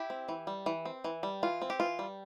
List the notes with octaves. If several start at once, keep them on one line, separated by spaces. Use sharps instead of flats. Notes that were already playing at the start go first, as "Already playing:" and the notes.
Already playing: E4 G4
C4
E3
G3
E3
C4
E3
G3
E3 F4
C4
G4
E3 F4
G3